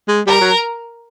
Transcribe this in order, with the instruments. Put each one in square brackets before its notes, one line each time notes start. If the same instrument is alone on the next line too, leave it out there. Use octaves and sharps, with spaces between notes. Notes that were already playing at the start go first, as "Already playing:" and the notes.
[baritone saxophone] G#3
[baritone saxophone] G3 [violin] A#4
[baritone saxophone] F#3